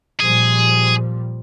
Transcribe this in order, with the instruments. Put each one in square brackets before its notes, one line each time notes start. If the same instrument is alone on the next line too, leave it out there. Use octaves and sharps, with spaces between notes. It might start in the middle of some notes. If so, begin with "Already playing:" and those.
[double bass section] A#2 F3 G3 [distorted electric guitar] G#4